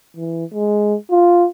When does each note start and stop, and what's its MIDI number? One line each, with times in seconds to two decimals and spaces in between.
0.16 0.45 52
0.53 0.95 56
1.11 1.47 65